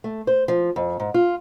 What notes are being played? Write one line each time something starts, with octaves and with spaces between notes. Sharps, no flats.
A3
C5
F3
F2
G#2
F4